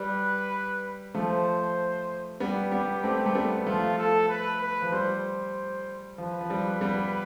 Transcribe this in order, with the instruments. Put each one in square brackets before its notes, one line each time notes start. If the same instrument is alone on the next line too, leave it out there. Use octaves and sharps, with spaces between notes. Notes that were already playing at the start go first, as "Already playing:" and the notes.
Already playing: [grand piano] G3 [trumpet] B4
[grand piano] F3 A3 [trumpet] C5
[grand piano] G3 B3 [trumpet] G4
[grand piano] G3 B3
A3 C4
A3
G3 B3
[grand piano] F3 A3 [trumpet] F4
[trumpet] A4
B4
B4
[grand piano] F3
[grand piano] G3 [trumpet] C5
[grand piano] F3 [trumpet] B4
[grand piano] F3
G3
G3 B3